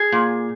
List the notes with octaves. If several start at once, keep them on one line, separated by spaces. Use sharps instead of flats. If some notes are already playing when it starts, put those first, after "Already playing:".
Already playing: G#4
A#2